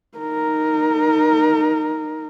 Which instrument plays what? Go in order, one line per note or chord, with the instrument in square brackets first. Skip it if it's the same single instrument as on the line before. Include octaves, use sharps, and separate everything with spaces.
[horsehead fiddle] D#4 A#4